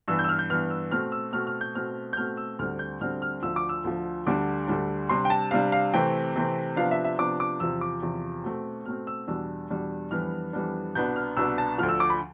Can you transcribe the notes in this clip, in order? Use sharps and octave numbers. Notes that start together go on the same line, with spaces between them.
G2 E3 B3 E6
G6
E6
F6
G6
G2 E3 B3 F6
E6
B2 A3 C4 F6
E6
B2 A3 C4 F6
F6
G6
B2 A3 C4 F6
G6
B2 A3 C4 F6
E6
D2 D3 G3 C4 F6
G6
D2 D3 G3 C4 F6
F6
D2 D3 F3 E6
D6
E6
D2 D3 F3
D2 D3 G3 D4 D6
D2 D3 G3 D4
C3 G3 D4 C6
G5
A5
C3 G3 D4 F5
F5
C3 E3 A3 C4 G5
C3 E3 A3 C4
C3 F3 B3 D4 F5
E5
E5
C3 F3 B3 D4 D6
D6
E2 C3 F3 E6
D6
E2 C3 F3
B2 A3 C4
B2 A3 C4 F6
E6
E2 B2 G3 D4 E6
E2 B2 G3 D4
F2 E3 G3 B3 D4 F6
F2 E3 G3 B3 D4
C2 B2 B3 D4 G6
F6
C2 B2 B3 D4 E6
A5
D2 D3 F3 F6
E6
D6
B5